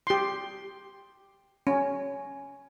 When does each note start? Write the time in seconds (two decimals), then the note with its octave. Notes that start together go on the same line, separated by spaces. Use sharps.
0.07 G4 C6
1.67 C#4